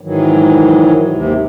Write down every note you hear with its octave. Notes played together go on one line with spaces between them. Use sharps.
G#2 D#3 E3 F#3
D#2 C3